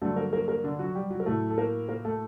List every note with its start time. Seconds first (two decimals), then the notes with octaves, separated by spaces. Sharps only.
0.02 G2 D3 F#3 A3 A4
0.16 A#3 A#4
0.33 A#3 A#4
0.48 A#3 A#4
0.64 D3 D4
0.79 F#3 F#4
0.95 G3 G4
1.10 F#3 F#4
1.20 A#4
1.26 A2 F#3 A3 A4
1.50 A4
1.58 A#3 A#4
1.89 A#3 A#4
2.05 A3 A4